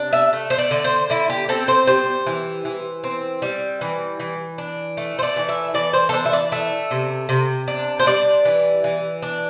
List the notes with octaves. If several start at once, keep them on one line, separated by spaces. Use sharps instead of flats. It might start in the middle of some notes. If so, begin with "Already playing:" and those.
Already playing: C3 D4
E5
A3
C5
D5
D3
C5
D3 E4
G4
C4 A4
C5
G3 C5
E3
E3
C4
G3
E3
E3
D4
A3
C5
D5
E3
E5
E3 D5
C5
A4
D4 C5
E5
D5
A3 E5
C3
C3
D4
C5
G3 D5
E3
E3
D4